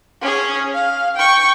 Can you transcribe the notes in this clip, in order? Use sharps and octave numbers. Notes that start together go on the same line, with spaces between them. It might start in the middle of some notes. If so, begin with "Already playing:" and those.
C#4 G#4
F5
G5 C#6